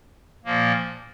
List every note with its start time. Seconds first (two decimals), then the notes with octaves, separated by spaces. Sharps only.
0.45 A#2 F3 A#3